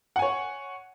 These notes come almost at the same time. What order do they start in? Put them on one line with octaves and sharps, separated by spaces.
F#5 G#5 C#5